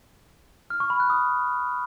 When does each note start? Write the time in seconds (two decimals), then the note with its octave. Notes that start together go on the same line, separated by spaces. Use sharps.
0.70 F6
0.80 C#6
0.90 B5
1.00 F#6
1.10 D#6